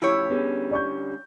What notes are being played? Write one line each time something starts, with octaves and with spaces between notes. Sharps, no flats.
A2 C#3 F3 E4 G4 C#5
D3 G3 B3 C#4 G#4
D5 C#6 G6